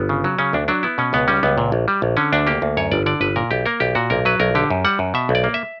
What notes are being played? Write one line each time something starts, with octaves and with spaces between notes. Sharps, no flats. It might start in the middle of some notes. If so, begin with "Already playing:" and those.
Already playing: G1 B3
C#3
F#3
C#3 C#4
D2 D4
F#3 D4
B3 E4
B2 C#4
C#2 B3
G3 C#4
C#2 B3
A#2
A#1
G3
A#1
D3 C#4
D2 D4
A#3 G4
D2
F#2 C#5
G1 D5
D3 D5
G1 B4
A#2 A#4
B1 G4
A#3 A#4
B1 G4
A#2 F#4
B1 A#4
F#3 B4
B1 A#4
D3 G4
F#2
G3 F#5
F#2
B2 E5
B1
D5
A#3
E5